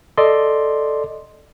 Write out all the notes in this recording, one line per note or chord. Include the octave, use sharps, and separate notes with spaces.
A4 D5 D#5 C6